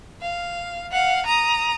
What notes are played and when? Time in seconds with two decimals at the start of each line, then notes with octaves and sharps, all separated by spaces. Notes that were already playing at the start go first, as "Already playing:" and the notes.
0.22 F5
0.91 F5 F#5
1.26 A#5 D#6